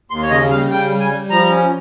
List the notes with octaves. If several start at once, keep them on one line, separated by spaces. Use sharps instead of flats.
D#2 C6
C#5
C#3 D#5
G3 F5
C#3 G5
G3
G#5
G3
F3 A#5
C#4